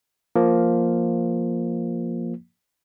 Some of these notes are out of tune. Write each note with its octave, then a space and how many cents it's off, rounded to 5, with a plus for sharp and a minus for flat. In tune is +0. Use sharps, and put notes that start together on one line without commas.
F3 +0 A#3 +0